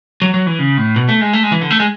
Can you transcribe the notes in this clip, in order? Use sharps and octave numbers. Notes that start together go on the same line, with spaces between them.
F#3
F#3
E3
C#3
A2
B2
A3
G#3
A3
G#3
E3
D3
A3
G#3